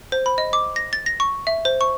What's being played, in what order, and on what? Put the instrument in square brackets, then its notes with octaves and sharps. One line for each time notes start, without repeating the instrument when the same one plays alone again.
[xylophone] C5
B5
D#5
D6
A#6
A6
A#6
C#6
E5
C5
C#6